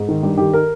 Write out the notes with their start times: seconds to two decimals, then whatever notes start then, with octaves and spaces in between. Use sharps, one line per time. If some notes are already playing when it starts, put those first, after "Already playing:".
Already playing: G#2
0.08 D#3
0.22 G2 G4
0.37 D#3 G4
0.53 A#4